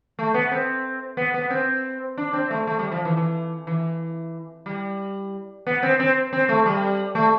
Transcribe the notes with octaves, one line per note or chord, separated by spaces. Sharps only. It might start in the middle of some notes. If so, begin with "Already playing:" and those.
A3
B3
C4
B3
B3
C4
D4
C4
A3
A3
G3
F3
E3
E3
E3
G3
B3
C4
C4
C4
A3
G3
A3